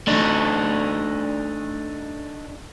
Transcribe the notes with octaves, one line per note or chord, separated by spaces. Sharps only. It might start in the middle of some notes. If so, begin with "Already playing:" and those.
A3 D4 D#4